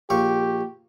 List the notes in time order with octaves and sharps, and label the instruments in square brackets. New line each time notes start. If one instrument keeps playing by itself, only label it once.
[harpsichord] A#1 F5 C#6 [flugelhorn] G4